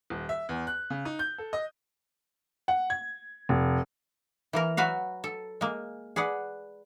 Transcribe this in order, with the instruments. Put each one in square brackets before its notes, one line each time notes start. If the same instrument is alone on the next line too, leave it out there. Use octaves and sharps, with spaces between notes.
[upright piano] D#1
E5
E2
F#6
C#3
D#4
G6
A4
D#5
[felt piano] F#5
G#6
F1
[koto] E3 A#3 A#4
F#3 F#4 B4 F5
A4
G#3 A#3
G#4 B4 D5 F#5